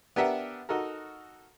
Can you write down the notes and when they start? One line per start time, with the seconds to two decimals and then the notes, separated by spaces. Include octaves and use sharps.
0.16 B3 D4 G4 A#4 E5 F#5
0.69 D#4 F#4 A4 A#4